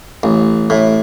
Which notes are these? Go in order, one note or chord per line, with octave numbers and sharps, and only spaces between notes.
A1
A2